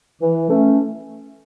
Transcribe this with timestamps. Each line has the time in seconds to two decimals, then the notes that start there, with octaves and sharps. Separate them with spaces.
0.22 E3
0.50 A3 C#4